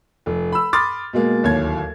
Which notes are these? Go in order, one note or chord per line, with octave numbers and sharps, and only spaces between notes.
F1
B5 E6
B5 C6 D6 D#6 F6 A6
B2 G#3 A#3
D1 D#2 C#5 G#6